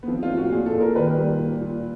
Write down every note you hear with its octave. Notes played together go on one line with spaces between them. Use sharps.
B3
F3 C4
F4
A2
F#4
A#2 G#4
G#4
A4
A#2
A#4
D#3 B4
G3
A#2
A#2